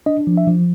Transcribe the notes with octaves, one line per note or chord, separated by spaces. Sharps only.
D4 D#5
F3
E5
F3